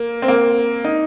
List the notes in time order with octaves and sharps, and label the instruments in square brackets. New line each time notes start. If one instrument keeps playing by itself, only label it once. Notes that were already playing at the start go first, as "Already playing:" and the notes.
Already playing: [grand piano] A#3
C4
A#3
D#4